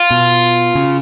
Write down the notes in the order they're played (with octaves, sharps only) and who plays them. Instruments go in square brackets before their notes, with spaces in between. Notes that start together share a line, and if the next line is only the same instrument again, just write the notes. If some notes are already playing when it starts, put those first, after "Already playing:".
Already playing: [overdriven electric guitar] F4
[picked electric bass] B2
C#3